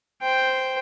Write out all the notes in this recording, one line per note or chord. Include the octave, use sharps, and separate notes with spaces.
C5 G5